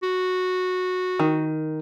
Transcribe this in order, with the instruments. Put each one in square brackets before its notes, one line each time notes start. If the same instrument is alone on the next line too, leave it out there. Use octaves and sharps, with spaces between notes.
[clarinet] F#4
[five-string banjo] D#3